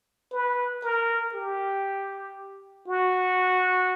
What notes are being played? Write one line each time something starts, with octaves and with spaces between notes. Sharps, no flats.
B4
A#4
G4
F#4